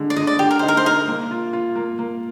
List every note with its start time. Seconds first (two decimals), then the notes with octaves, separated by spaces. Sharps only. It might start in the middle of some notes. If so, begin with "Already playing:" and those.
Already playing: D3 G#3
0.10 D5
0.16 D3 D#5
0.27 D5
0.39 D3 G4
0.51 A#4
0.59 D#4 C5
0.68 A#4
0.77 C5
0.85 D#4 A#4
1.08 A#3
1.31 F4
1.53 F4
1.76 A#3
1.99 A#3